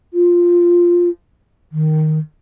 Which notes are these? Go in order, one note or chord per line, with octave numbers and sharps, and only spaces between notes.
F4
D#3